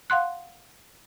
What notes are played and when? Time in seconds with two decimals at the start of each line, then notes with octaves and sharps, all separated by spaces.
0.10 F5 F#5 C6 F#6